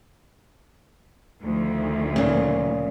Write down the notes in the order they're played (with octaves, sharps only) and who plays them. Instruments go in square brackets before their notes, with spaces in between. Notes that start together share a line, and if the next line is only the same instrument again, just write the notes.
[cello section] D2 D#3 F3
[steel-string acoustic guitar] A#2 C#3